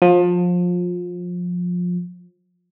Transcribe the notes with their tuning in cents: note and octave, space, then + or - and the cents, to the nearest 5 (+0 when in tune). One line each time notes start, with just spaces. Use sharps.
F3 +25